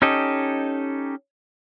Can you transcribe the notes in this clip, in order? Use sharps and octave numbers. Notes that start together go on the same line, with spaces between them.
C#4 D#4 G4 A4 D#5